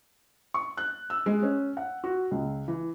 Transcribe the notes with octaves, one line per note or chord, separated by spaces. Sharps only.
C#6
F#6
E6
G#3
C#4
F#5
F#4
C#2
E3